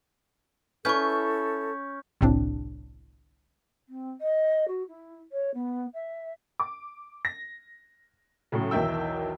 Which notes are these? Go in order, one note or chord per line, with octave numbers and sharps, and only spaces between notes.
C#4 E4 A4 B4 C#6 G6
G1 C2 A2 C3 C4 D4
C4
D#5
F#4
E4
C#5
B3
E5
D6
A#6
A2 C#3 F#3
B1 E2 D#3 E4 G5 E6